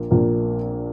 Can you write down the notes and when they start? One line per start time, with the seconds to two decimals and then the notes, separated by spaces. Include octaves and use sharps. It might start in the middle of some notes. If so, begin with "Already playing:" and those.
Already playing: A#1 A#2 A#3
0.11 A#1 A#2 A#3